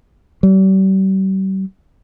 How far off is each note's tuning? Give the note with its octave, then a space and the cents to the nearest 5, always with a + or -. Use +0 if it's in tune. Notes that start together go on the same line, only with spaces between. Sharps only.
G3 -40